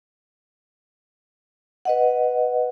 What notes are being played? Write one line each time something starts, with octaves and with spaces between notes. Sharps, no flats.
B4 D#5 F#5